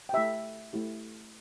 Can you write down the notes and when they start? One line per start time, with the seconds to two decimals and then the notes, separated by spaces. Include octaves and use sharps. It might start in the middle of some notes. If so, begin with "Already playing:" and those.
0.09 G5
0.13 A3 E4 G4 E5
0.73 A3 E4 G4